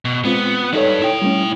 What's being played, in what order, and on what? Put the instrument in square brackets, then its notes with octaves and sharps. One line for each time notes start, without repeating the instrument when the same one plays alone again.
[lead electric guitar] B2
[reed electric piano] G#3 C4 F4 [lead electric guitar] B3
[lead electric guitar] G3 B4 [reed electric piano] D#4 A4 C#5
[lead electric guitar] E4 G5
[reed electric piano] G3 A3 C#4